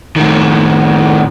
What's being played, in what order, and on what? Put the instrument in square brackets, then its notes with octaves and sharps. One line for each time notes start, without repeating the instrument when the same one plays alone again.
[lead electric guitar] A2 D#3